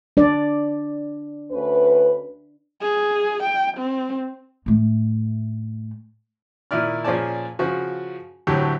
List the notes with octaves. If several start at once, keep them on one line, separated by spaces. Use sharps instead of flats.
D4 D5
D2 C#4 B4
G#4
G5
C4
A2 A3
A#2 D#3 E4 D5 F6
A#2 F3 C#4 G#4 D5 A5
C#3 F3 F#4
D2 A2 F#3 G4